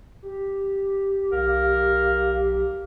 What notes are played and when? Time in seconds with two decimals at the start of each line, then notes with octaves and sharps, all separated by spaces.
0.22 G4
1.32 B1 A#4 F5